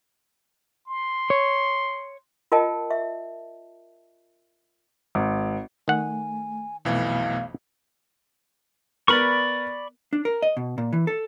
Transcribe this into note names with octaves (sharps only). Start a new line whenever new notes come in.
C6
C#5
F4 A#4 D#5 G5 A5
E5
G#1
D#3 A3 F#5 G#5
B1 F2 B2 E3 A3 B3 F5
B3 A#4 D5 B5 C#6
D4
A#4
D#5
B2
A#2
E3
A4